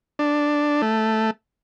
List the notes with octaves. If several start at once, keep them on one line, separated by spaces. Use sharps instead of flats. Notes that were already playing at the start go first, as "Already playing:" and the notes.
D4
A3